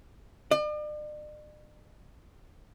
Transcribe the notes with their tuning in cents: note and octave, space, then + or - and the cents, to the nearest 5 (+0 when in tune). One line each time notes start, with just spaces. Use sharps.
D5 +45